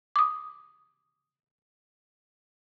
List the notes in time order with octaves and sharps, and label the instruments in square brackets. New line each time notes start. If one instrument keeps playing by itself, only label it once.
[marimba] D6 D#6